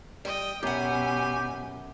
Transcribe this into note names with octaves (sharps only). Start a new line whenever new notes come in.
G3 D#5 G5
F#2 B2 G4 F#5 G#5